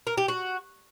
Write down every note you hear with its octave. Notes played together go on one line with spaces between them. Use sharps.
A#4
G4
F#4